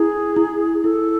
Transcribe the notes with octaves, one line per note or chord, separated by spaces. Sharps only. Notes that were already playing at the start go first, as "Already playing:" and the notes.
Already playing: E4 G#4
E4
E4 A4